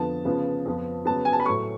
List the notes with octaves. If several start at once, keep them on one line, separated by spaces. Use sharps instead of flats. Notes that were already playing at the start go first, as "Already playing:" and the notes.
Already playing: F2 D3 F3 B3 A5
C#3 F3 B3
F2 F3 B3
C#3 F#3 B3 A5
G#5
A5
B5
A2 F#3 A3 C#6